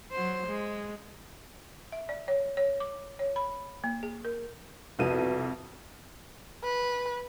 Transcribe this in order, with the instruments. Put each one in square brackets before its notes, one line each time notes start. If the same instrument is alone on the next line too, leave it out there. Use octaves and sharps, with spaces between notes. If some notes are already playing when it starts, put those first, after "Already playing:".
[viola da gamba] F#3 C5
G#3
[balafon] E5
D5
C#5
C#5
D6
C#5
B5
A#3
G#4
A#4
[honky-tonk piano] C2 F2 D#7 [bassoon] B2
[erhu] B4